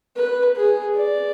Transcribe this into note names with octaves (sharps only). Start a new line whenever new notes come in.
B4
G#4
D5